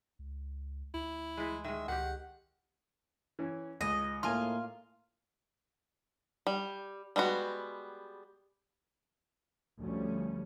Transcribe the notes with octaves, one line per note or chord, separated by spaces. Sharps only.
C#2
D2 E4
E3 G#3
D#3 G#3 E5
C#2 D#3 G4 F#5
E3 C#4
C#2 D#5
A2 A#3 F4 G#5 C6
G3
G3 G#3 B3 F#4
D2 F3 G3 C#4